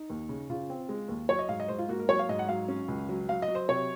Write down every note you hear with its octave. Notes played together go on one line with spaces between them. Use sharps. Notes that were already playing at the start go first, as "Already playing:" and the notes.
Already playing: D#4
D#2
C#3
C#3 F4
C4
G#3
D#2
F#3 C#5
D#5
G#2 F5
D#5
G#2 C5
F4
A#3 F#4
A#4
F#3 C#5
F5
G#2 D#5
F#5
F#3 F5
C#4
C#2
F#3
F#3 F5
D#5
F#3
C5
C3 C#5